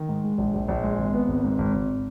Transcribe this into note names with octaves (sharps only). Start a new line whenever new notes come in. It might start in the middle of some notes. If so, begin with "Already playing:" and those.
Already playing: D#3
G#2
G#3
A#1
A#1
A#1
G#3
G#1
B3
G#1
G#2
G#1
G#1